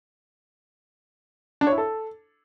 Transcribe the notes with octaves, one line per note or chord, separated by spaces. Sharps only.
D4
C#5
E4
A4